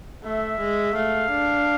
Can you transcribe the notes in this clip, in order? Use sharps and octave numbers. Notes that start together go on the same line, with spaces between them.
A3 E5
G#3
A3 F5
D4